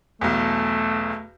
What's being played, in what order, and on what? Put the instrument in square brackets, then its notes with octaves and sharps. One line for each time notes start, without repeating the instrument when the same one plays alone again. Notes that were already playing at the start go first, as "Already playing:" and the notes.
[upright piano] B1 E2 [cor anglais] A3